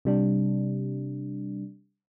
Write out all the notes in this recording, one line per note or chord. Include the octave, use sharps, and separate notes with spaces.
C3 G3 D4